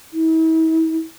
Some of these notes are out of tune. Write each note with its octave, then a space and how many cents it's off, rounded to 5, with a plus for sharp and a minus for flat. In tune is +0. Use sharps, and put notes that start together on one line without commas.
E4 -40